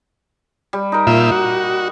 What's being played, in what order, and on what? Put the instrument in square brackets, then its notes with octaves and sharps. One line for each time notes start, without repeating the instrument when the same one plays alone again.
[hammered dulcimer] G3
D#4 A#4
[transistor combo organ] A#2 F4 E5
F#4